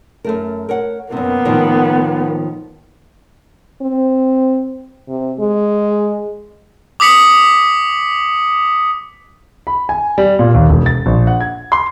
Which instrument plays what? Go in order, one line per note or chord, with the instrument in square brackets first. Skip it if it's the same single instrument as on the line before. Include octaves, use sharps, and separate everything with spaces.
[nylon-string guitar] F#2 A3 A#4
A#4 C#5 F#5
[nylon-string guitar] F#2 C3 [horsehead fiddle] A#3 B3
[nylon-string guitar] A2 D#3 F3
[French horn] C4
C3
G#3
[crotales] D6 D#6 B6 C#7 F#7
[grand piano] B5
G#5
G3
A#2
D#2
E1
A6
A#1
F#5
G#6
C6